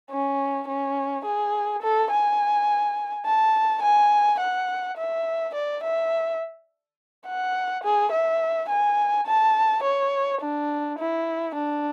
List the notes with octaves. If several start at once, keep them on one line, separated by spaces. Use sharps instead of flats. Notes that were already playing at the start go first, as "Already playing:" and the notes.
C#4
C#4
G#4
A4
G#5
A5
G#5
F#5
E5
D5
E5
F#5
G#4
E5
G#5
A5
C#5
D4
E4
D4